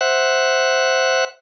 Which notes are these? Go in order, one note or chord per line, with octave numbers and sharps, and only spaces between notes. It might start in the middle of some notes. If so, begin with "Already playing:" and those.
C5 E5 F#5 F#6